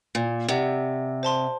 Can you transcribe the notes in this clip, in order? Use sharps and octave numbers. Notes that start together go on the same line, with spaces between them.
A#2
C3 G4 D5 F#5
C5 A5 C6